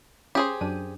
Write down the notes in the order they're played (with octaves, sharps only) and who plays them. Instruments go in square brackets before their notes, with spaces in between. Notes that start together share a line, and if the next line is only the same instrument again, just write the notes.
[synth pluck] C#4 [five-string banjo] G4 G#4 C5
[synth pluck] F#2 D4 D#7